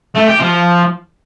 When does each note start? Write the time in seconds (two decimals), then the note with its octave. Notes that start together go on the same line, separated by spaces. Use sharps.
0.15 A3
0.27 G4
0.39 F3